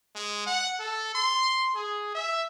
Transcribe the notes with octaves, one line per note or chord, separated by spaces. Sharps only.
G#3
F#5
A4
C6
G#4
E5